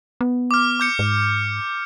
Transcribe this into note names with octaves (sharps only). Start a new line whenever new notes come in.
B3
D6 F6
D6 G6 C#7
G#2